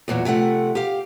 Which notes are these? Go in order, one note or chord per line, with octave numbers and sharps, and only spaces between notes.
E2 A#2 F#3 F#4
C3 F3 A3 F#5
G4 F5